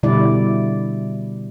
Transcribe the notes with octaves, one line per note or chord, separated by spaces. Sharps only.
B2 D3 G3 E4 D5